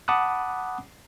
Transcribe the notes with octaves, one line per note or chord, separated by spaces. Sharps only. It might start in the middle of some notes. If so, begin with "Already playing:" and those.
F#5 A5 B5 D6 D#6 F#6